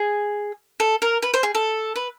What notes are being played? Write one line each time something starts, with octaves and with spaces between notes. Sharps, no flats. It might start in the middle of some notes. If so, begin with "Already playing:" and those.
Already playing: G#4
A4
A#4
B4
C5
G#4
A4
B4